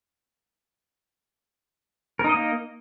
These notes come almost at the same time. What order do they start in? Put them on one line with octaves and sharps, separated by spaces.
A#4 D#4 D#5 A#3